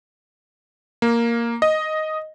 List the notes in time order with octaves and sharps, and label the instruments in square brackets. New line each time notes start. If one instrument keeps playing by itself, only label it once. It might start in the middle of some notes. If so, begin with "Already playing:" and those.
[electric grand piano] A#3
D#5